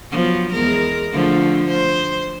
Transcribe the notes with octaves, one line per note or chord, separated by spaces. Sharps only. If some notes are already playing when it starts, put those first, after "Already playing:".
F3 F#3 B3
E2 G#3 A#4
D3 F3 A3
C5